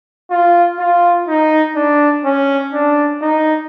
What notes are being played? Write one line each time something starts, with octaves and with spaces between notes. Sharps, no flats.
F4
F4
D#4
D4
C#4
D4
D#4